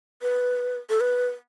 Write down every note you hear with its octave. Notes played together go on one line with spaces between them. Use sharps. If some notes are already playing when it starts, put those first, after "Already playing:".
B4
A4
B4